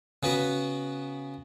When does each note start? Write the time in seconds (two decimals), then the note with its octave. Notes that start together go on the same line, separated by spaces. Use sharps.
0.23 C#3 B3 F#4 B4